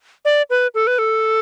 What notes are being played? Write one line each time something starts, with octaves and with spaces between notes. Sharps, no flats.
D5
B4
A4
B4
A4